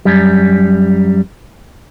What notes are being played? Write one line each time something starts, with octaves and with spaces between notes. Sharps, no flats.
F#2 G3